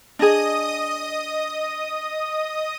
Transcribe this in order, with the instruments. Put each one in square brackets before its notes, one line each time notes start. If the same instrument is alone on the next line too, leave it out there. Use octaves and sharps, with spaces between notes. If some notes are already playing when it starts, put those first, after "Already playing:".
[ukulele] D4 G#4 [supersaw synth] D#5 D#6